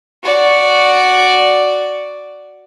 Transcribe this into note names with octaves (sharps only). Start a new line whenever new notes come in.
F#4 D5